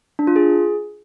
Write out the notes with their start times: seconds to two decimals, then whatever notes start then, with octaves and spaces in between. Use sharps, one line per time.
0.19 D4
0.27 F4
0.36 G#4